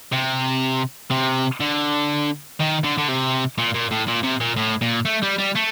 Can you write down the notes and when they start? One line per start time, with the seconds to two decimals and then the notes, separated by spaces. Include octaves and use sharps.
0.12 C3
1.11 C3
1.60 D3
2.60 D#3
2.84 D3
2.98 D3
3.09 C3
3.58 A#2
3.74 A#2
3.91 A2
4.08 A#2
4.23 C3
4.41 A#2
4.56 A2
4.82 A#2
5.05 A3
5.23 G3
5.38 G3
5.55 A3